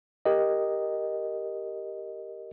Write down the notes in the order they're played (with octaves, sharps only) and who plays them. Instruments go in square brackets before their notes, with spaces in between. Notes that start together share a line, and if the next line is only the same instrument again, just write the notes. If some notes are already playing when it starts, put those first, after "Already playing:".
[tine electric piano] G4 A#4 D#5